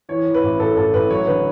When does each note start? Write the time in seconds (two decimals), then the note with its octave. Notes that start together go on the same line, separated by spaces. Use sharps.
0.09 E3 C#5
0.26 E3
0.34 B4
0.43 A1
0.60 A1 A4
0.77 A1 A4
0.94 A1 B4
1.10 F#3 C#5
1.27 D3 B4